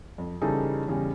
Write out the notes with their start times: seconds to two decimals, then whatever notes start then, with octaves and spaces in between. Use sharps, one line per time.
0.18 F2
0.42 C#3 E3 G3 D#4 G#4 A4
0.88 E2 C#3 G3